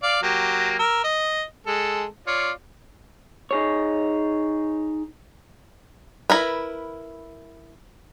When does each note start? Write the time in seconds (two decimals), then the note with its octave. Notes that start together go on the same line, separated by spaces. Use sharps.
0.03 D5 F5
0.23 F#3 A#3 G4
0.79 A#4 E6
1.04 D#5
1.67 G#3 A4
2.27 F4 C#5 D5
3.51 D#4 G#4 C#5
6.30 E4 A#4 B4